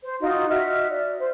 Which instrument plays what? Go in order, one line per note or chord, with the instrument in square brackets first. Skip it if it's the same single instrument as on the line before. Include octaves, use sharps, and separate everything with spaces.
[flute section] C5
D#4 F4 F#4 D#5
F#4 D#5 E5 F6
D5
C5